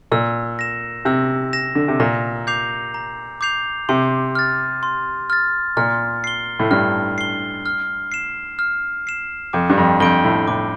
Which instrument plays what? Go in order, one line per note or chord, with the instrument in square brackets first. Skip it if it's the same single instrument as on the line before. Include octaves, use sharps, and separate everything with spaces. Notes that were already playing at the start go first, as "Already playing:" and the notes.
[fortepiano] A#2 [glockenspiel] E6
[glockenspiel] A#6 E7
[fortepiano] C3 [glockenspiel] E6
[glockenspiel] A#6 E7
[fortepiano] D3
C3
[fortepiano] A#2 [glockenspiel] A#5
[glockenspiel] D6 G6 C7 F7
A#5
D6 G6 C7 F7
[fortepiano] C3 [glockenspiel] C6
[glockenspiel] F6 A6
C6
F6 A6
[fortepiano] A#2 [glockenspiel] F6
[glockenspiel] C7 G7
[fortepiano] A2
[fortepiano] G2 [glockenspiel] F6
[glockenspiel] C7 G7
F6
C7 E7
F6
C7 E7
[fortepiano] F2 [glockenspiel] D6
[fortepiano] G2
F2
[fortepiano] F2 [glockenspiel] G6 D7 G7
[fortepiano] A2
[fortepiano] A2 [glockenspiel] D6